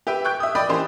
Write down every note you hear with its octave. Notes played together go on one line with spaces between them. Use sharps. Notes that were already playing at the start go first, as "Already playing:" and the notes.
G4 B4 E5 G5
G5 C#6 F#6 G6 D7
E5 D#6
D5 D#5 G5 B5 D#6
E3 A#3 C#4 G4 C5